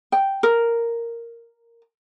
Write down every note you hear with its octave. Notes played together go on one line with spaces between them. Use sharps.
G5
A#4